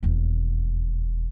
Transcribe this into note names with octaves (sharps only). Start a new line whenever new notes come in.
E1 D#2